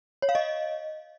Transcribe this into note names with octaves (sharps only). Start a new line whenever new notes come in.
C#5
F5
D#5